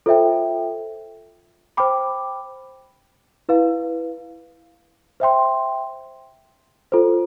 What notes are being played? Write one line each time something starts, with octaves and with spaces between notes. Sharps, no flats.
F4 A4 C5 E5 G5
C5 G5 B5 D6
E4 B4 F5
C5 E5 G5 C6
F4 A4 C5